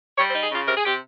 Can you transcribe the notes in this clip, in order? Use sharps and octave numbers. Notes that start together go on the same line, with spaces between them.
G3 C#5
C5
D#4
G#4
C#3 F4
C3 A#4
G#4
C3 G4